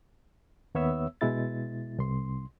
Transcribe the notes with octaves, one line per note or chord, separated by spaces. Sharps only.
D#2 B3 C#5 E5 E6
B2 G#3 E4 A6
C2 C6